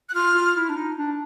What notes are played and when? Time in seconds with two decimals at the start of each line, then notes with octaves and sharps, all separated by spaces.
0.09 F#6
0.15 F4 F6
0.35 F4
0.55 E4
0.69 D4
0.76 D#4
0.97 D4